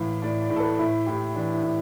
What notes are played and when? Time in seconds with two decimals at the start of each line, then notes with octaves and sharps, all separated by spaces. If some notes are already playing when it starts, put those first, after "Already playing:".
Already playing: A2 E3 F5
0.22 A2 D5
0.42 D5
0.50 A2
0.56 A4
0.60 B4
0.79 A2 E4
1.06 A2 G4
1.35 E3 D4
1.53 E4
1.63 A2